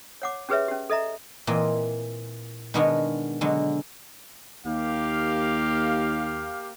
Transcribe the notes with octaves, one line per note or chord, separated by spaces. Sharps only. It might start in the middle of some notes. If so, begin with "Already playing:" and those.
C#5 F#5 D6
C#4 G4 G#4 B4 C#5 E5
C#4 G4
A4 D#5 E5 A#5
A#2 E3 A#3 C4 D#5
B2 D#3 G#3 B3 D4 F#4
B2 D3 F#3 G#3
D#2 A#3 G4 F5